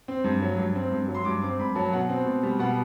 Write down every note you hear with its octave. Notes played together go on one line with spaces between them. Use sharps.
C4
G2
F#3
G2
C4
G2
F#3
C6
G2 D6
C4 D6
G2 B5
F#3 A5
B2 F#5
C4
B2
G3
B2 F#5